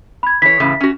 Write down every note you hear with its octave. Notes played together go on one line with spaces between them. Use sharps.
B5 G#6
E3 C#5 B6
A2 C#3 E3
C#4 F#4